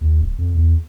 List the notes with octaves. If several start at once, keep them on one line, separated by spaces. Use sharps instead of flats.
D#2
D1
F2
E2